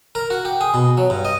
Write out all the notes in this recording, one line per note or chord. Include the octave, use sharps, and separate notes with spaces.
A#4
F#4
G4
G#4
B2
F#3
G2
D#5